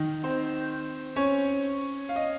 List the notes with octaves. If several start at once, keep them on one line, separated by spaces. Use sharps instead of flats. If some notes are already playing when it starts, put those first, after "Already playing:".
Already playing: D#3 D#4
C4 C5
C#4 C#5
F5
D#5